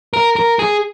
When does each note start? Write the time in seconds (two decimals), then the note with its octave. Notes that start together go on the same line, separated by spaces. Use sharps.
0.13 A#4
0.36 A#4
0.59 G#4